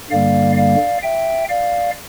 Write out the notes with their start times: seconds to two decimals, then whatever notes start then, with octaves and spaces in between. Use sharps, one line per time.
0.10 G2 D3 G3 A#3 D5 F5
0.56 D5 F5
1.03 E5 G5
1.49 D5 F5